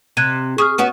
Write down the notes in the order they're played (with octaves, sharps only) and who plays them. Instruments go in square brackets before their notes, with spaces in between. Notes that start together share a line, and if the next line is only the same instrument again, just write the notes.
[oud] C3 [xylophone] F#6 G#6 D#7
[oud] G#4 [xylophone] C#6 D#6 F6
[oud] B3 C#4 F#4